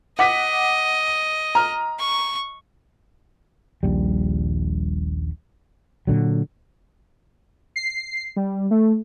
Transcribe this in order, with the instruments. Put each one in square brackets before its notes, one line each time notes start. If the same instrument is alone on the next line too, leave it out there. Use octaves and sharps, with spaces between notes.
[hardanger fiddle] D#5 [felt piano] F#5 D6 B6
[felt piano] A#5 F6
[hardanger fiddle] C#6
[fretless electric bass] D#1 A#1 G3
A#2 D3 F#3
[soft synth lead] C7
G3
A3